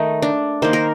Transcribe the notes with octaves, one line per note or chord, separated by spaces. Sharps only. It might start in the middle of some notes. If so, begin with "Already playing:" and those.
Already playing: D#3 A3 D#4
D4
D#3 A#3 C5
A#4